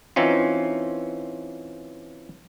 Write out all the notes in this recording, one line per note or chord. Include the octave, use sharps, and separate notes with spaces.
E3 C4 C#4 D#4 F4